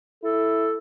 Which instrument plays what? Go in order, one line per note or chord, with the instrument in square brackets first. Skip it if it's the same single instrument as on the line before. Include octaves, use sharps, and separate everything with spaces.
[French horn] E4 [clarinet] A4